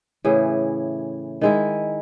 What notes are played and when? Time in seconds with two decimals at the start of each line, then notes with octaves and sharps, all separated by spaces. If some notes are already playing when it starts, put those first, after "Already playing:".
0.25 A2 C#3 E3 G#4
1.41 D#3 G#3 E4